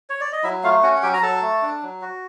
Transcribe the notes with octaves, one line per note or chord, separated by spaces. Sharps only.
C#5
D5
D#5
F#3 E4 E5
A3 F4 F5
C#4 F#4 F#5
F#5
F#3 G4 G5
A#5
F#3 A4 A5
A3
D4
F#3
F#4